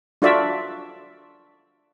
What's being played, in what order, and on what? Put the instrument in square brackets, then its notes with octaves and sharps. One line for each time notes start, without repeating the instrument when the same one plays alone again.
[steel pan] D4 F4 F#4 A4 D5 E5